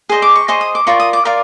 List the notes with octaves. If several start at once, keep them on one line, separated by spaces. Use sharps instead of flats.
G#4 C5 D#5
D6
C#6
G#4 C5 D#5 C#6
D#6
D6
F4 A#4 D5 C#6
D#6
D6
F4 A#4 D5